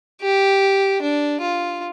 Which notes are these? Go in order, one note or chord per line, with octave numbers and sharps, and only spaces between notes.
G4
D4
F4